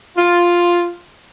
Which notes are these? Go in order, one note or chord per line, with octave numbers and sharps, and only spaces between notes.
F4